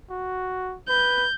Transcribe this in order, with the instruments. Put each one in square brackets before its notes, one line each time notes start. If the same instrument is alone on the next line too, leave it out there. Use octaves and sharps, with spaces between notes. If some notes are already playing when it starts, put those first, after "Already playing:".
[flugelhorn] F#4
[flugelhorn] B4 [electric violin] G6